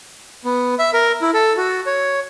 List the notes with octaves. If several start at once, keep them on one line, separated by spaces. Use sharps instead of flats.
B3
E5
A#4
E4
A4
F#4
C#5